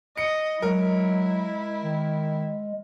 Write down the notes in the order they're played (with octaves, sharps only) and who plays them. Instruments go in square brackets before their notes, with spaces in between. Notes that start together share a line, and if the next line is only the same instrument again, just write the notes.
[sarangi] D#5 [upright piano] C#7
[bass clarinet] F#3 [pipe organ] G#3 [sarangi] E4 [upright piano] A#4
[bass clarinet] D#3